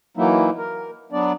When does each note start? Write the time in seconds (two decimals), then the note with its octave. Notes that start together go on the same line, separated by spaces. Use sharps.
0.17 E3 F#3 A#3 D#4 E4
0.58 A#4
1.12 F#3 B3 D4 D5